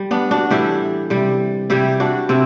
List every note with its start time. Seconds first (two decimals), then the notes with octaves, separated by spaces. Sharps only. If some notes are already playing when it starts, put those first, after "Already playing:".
Already playing: G3
0.11 B3 D4
0.31 D4 F#4
0.50 A2 E3 G3 E4 G4
1.10 C3 G3
1.70 C3 G3 E4 G4
2.00 D4 F#4
2.29 C3 C4 E4